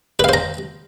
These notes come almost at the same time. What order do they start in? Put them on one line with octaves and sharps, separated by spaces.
B4 F5 C5 A#5